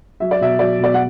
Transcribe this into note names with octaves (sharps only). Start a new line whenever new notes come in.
F#3 E5
D5
B2 E5
F#3 D5
B2 D5
F#5